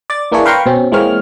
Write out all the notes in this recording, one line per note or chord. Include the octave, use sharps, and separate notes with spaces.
D5 A6
E3 A#3 D4 E4 G#4 C#5
B4 F5 G5 A#5 C6 C#6
B2 C4 C#4
E3 G#3 A#3 C4 C#5 F6